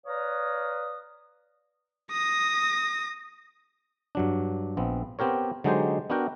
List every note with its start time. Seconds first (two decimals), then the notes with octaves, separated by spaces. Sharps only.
0.05 B4 C#5 D5 F5 A#5 D#6
2.11 D#6 A#6
4.15 G2 F#3 D4
4.77 A#1 B3 C4
5.19 B3 C4 G4 A#4 C#5
5.64 D3 F#3 G#3 D#4 G4 C5
6.10 B3 D4 F#4 A#4 G5